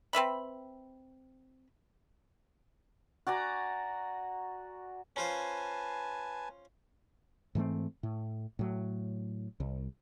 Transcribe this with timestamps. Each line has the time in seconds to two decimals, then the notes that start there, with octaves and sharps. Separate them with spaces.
0.13 C4 B4 E5 B5
3.27 F#4 D5 G#5 A#5
5.16 C#4 F4 B4 C5 G#5 A5
7.55 G#2 E3 A3 C4
8.03 A2
8.59 A2 F#3
9.60 C2